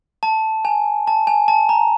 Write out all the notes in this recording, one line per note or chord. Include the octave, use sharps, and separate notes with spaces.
A5
G#5
A5
G#5
A5
A#5